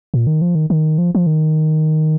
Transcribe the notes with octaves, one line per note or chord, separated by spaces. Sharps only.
A#2
D#3
F3
D#3
D#3
F3
F3
D#3